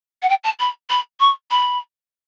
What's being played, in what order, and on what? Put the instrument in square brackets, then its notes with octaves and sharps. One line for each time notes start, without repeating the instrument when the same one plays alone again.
[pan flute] F#5
G5
A5
B5
B5
C#6
B5